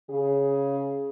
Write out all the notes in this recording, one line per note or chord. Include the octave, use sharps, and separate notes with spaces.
C#3 G#4